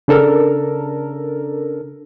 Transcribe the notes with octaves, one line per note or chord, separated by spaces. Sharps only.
C#3 D4 A4 A#4